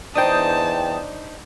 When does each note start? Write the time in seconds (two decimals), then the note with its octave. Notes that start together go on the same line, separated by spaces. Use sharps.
0.15 E2 D4 D#4 C5 G5 A5 D#6